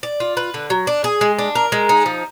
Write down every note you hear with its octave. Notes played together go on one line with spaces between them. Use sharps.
D5
F4
B4
D3
F#3
D4
G#4
G#3
D4
A#4
G#3
D#4
F3